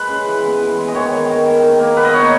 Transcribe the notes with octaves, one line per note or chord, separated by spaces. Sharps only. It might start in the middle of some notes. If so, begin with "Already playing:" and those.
Already playing: G#3 B4
C#3
E3
B3
E3
G#3
D#5
D#3 C#5
D#3
D#3
D#3
D#3
A#3
B3 B4
D#5
D#4 C#5